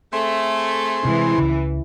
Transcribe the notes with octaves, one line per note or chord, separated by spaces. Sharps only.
A3 C4 G#4 C6
C3 E3 G#3
C#2 C#3